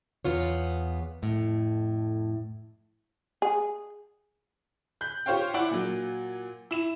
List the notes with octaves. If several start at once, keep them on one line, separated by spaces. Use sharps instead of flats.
E2 B3 F4 C#5
F2 A2
G#4
F#6 G6
F4 G4 C5 C#5 F5 G5
E4 D5 F#5 D6 D7
A#2 F#3
E4 E7